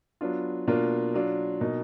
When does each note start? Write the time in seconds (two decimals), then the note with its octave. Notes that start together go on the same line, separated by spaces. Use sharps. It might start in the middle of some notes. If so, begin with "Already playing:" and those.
0.21 F#3 B3 D4 F4
0.67 B2 A#3 D4 F4
1.14 F#3 D4 F4
1.61 B2 A#3 D#4